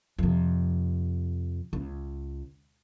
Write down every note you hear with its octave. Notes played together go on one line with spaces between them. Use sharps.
F2 C3
C#2